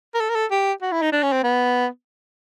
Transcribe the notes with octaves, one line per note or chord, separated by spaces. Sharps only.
A#4
A4
A#4
A4
G4
F#4
E4
D#4
D4
C#4
C4
B3